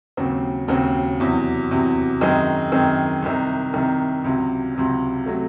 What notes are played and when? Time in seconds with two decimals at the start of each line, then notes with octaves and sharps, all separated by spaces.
0.17 D#2 C#3 F#3 C4
0.68 D#2 C#3 F#3 C4
1.20 E2 C3 F#3
1.71 E2 C3 F#3
2.21 F#2 D#3 G#3 C4
2.72 F#2 D#3 G#3 C4
3.22 C2 C3 D#3
3.74 C2 C3 D#3
4.24 C#2 C3 F#3
4.75 C#2 C3 F#3
5.26 C3 F#3 A3